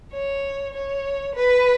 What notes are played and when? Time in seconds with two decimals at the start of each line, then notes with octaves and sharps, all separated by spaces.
0.12 C#5
0.74 C#5
1.35 B4